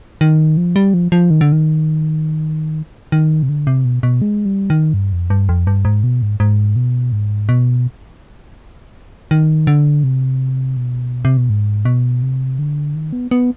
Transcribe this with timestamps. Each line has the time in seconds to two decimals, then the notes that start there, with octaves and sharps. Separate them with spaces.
0.21 D#3
0.57 F3
0.76 G3
0.94 F3
1.12 F3
1.30 D#3
1.41 D3
1.52 D#3
3.12 D#3
3.43 C3
3.49 D3
3.67 C3
3.85 B2
4.03 B2
4.22 G#3
4.45 G3
4.70 D#3
4.94 G2
5.12 F2
5.30 G2
5.49 F2
5.67 G2
5.85 G#2
6.03 B2
6.22 G#2
6.40 G#2
6.76 B2
7.12 G#2
7.49 B2
9.31 D#3
9.67 D3
10.04 C3
10.77 B2
11.25 C3
11.37 B2
11.50 G#2
11.85 B2
12.22 C3
12.59 D3
12.95 D#3
13.13 B3
13.31 B3